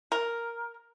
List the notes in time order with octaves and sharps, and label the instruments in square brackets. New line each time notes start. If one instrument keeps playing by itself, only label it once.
[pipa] A#4